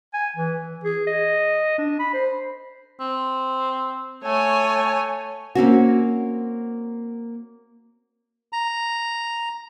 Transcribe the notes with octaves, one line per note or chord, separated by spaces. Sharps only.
G#5
E3
G#4
D#5
D4
B5
C5
C4
A3 C#5 G#5
A#3 C4 C#4 F#4
A#5